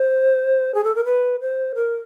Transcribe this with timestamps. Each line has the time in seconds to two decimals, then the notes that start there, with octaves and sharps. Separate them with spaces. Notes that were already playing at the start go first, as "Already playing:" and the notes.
Already playing: C5
0.75 G#4
0.84 A4
0.96 A#4
1.05 B4
1.41 C5
1.75 A#4